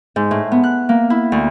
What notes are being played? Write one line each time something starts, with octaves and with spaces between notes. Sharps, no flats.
G#2
A2
B3
F#6
A#3
E4
D2